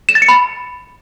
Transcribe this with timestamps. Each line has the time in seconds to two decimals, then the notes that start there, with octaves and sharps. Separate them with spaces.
0.09 E7
0.15 A6
0.22 C#7
0.29 B5